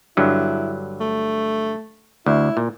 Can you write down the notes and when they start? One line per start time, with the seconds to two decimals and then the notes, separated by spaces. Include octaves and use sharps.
0.17 G2 D3 F#3 E4
1.00 A3
2.26 D2 E4
2.57 A#2